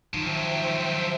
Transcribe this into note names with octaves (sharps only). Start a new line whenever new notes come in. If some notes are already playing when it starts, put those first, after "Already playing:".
D#3 F3 F#3 C5 E5 G5